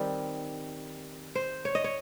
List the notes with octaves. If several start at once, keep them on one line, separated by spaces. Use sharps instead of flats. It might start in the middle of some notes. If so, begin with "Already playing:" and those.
Already playing: D#3 G3 C4
C5
C#5
D#5
C#5